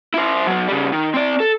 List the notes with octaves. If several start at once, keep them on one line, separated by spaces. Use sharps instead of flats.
E4 C5
F#3 B3
C#3 G3
D#3
C4 D5
A4